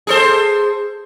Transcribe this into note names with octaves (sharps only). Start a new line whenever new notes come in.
G#4 A4 C5